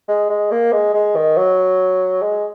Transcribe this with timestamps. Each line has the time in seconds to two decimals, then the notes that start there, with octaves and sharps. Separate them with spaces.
0.08 G#3
0.30 G#3
0.51 A#3
0.72 G#3
0.94 G#3
1.16 D#3
1.37 F#3
2.22 G#3